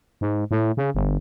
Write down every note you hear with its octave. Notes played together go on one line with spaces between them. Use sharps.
G#2
A2
C#3
G1